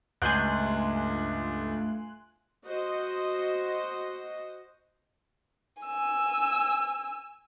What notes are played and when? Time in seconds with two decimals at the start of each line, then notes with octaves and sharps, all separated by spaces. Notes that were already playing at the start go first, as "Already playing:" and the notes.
0.22 C#2 G2 A3 F4 G#5 C6 F#6 G6
2.65 F#4 C5 D#5
5.83 G#5 E6